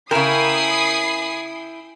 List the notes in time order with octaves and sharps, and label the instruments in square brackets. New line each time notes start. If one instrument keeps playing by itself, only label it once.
[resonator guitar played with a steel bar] C#3 A#4 [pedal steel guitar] E4 G5 [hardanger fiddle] G#5 B5 [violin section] D#6 C7